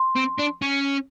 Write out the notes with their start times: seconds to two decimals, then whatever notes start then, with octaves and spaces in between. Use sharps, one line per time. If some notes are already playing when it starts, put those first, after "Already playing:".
Already playing: C6
0.16 C4
0.38 D4
0.62 C#4